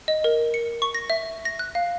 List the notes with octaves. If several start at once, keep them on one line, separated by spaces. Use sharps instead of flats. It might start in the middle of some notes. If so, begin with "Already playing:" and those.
D#5
A#4
C#7
C#6
A#6
E5
A#6
F#6
F5